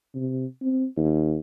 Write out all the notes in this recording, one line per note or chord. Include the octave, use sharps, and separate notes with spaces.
C3
C4
D#2